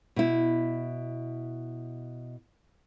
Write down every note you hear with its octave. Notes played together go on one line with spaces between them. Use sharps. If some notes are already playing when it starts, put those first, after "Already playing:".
B2 E4